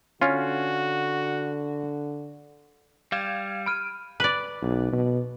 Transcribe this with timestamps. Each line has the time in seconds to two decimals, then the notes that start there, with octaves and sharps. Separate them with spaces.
0.21 D3 C#4 F4 F#4
3.12 G3 F5 G#6 E7
3.66 B5 F6 D7 D#7
4.20 B4 D5
4.62 B1
4.92 B2